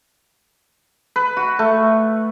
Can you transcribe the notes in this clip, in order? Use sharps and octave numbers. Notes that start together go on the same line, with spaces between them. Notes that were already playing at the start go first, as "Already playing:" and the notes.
B4
F#4
A3